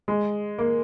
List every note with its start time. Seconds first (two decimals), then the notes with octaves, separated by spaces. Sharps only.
0.08 G#3
0.58 A#3